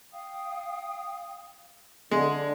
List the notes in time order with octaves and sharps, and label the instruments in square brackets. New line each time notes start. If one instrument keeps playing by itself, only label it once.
[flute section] F5 G5 D#6
[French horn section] D3 [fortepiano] G#3 [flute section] E5